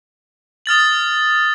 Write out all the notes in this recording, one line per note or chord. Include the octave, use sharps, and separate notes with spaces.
D#6 F6 A6 F#7